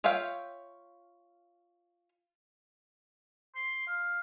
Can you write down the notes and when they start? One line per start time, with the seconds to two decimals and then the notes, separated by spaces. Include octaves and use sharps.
0.04 F4 C#5 E5 F5 G5
3.56 C6
3.87 F5